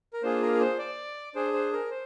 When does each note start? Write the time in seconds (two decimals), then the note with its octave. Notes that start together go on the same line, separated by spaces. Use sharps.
0.13 A#4
0.23 A#3 D4 F4 G#4 C5
0.42 A#4
0.61 C5
0.79 D5
1.35 D4 G#4 C5
1.53 C5
1.73 A#4
1.91 C5